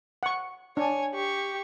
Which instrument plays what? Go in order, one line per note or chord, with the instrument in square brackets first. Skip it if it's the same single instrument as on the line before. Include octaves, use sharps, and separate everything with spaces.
[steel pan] F#5 C#6
[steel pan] D4 [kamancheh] C#5 G#5
[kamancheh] G4 C#6